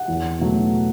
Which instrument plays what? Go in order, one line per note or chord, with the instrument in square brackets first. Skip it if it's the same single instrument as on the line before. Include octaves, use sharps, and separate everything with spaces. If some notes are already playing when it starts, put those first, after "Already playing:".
Already playing: [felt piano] F#5
E2
B2 F#3 A3